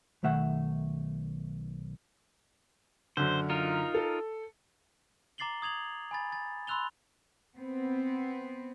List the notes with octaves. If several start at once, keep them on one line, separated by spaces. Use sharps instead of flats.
B1 D#3 A3 E5 F#5
F#2 D3 C5
D#4 F4 A#4
A4
A#5 D6 A6 C7 F#7 G7
D#6 G#6 F7 F#7
G#5 B5 A6
A6
B5 C6 E6 F#6 F7 G7
B3 C4